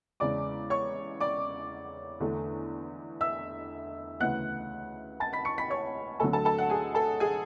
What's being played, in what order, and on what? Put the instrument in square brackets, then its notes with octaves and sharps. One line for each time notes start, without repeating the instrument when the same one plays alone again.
[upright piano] E2 C#3 G#3 D5 D6
C#5 C#6
D5 D6
E2 D3 A3 D4
E5 E6
D2 C#3 E3 B3 F#5 F#6
A5 A6
B5 B6
C#6 C#7
B5 B6
C#5 C#6
D2 D3 F#3 A4 A5
A4 A5
A4 A5
F#5
G#4 G#5
A4 A5
G#4 G#5